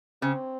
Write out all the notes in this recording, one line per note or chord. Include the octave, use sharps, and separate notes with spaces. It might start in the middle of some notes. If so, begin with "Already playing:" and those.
C#3 C4